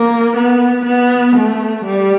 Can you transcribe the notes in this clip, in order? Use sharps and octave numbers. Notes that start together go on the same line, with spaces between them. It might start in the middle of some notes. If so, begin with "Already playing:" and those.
Already playing: A#3
B3
B3
A3
G3